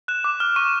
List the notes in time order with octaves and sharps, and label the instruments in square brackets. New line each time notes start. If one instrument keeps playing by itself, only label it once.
[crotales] F#6 E7
D6
F6
C#6 D#7